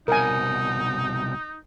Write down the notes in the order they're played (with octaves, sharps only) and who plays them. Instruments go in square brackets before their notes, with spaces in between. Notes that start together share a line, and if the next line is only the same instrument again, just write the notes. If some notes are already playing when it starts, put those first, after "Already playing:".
[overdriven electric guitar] C2 B2 [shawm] D#4 [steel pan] A#4 G#5